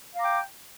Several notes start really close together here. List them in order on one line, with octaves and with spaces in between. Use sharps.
F5 A#5 D6 G5